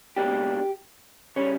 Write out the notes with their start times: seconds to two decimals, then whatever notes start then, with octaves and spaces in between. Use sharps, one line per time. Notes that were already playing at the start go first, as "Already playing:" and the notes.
0.16 C#2 B2 A#3 D4 G4
1.36 C#3 G3 C#4 C#5